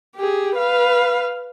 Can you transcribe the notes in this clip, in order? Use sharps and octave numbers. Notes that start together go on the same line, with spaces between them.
G4 G#4
B4 F5